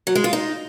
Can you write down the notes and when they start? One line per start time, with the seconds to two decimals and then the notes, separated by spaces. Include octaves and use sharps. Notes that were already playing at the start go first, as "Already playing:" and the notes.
0.07 F#3
0.15 G#3
0.24 F4
0.33 D#4